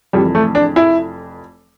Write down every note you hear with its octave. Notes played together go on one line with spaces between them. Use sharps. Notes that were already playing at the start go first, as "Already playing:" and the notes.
F1 F2 E3 G3
A3
D4
E4